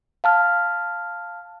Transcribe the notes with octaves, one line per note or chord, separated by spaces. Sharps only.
F5 A5 F6